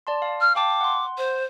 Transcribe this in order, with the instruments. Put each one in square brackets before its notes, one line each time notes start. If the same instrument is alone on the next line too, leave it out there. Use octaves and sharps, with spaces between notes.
[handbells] D5 A5 C6
F5
[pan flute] F6
[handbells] F5 G5 A5 [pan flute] D6
[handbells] F#5 C6
[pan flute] C5